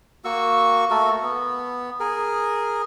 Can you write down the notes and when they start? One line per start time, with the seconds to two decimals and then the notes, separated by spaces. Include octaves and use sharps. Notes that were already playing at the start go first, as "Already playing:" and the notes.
0.25 A#3 F#4 C#6 E6
0.90 A3 F#4 A4 A#4
1.23 B3
2.00 G#4 A#4